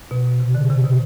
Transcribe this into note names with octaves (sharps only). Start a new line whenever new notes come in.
B2
C3
D3
C3
B2